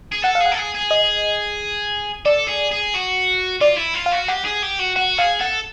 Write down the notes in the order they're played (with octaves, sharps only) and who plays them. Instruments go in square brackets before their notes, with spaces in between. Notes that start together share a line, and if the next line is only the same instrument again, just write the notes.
[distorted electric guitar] G#4
[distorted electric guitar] A4 [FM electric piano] F#5
[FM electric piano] F5
[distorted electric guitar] G#4
[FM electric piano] F#5
[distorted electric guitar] A4
G#4
G#4
[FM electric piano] D#5
[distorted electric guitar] A4 [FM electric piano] D5
[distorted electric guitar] G#4
G#4
F#4
[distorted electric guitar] F4 [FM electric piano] D5
[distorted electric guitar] E4
F4
[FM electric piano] F5
[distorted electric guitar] F#4
[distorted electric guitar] G4 [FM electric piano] F#5
[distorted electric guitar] G#4
G4
F#4
[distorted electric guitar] F#4 [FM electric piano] F#5
[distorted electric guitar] G#4 [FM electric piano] F5
[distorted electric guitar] A4 [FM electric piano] F#5